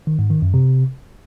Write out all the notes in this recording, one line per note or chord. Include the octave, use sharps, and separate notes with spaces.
D#3
G#2
D#3
F#2
C3